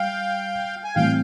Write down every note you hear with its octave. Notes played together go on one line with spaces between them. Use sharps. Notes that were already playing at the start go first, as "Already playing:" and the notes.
Already playing: G3 F5 G5
G#5
A2 E3 G3 C4 F5 G5